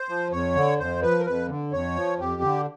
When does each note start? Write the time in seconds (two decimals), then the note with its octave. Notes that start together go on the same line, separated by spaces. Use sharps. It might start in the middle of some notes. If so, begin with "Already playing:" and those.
Already playing: C5
0.09 F3
0.32 F2 C#5
0.55 D3
0.79 F2 C5
1.02 F3 B4
1.20 A#4
1.26 F2 B4
1.48 D3
1.72 F2 C#5
1.96 F3
2.19 F2 G4
2.42 D3